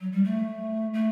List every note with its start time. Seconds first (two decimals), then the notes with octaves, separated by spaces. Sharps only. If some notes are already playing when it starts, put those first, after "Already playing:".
0.01 F#3
0.12 G3
0.24 A3
0.94 A3